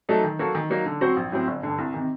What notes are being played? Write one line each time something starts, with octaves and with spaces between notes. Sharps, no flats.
F#3 A3 D#4 A4
D#3
F#3 A#3 F#4 A4
D#3
F#3 A#3 D#4
D3
F#3 C4 F#4 C5
A#1
A2 F#3 C4
G1
G2 D3
C2
C3 D#3